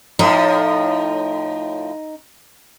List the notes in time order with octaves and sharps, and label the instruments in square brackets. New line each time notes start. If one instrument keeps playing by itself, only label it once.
[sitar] A2 F3 [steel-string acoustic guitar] D#4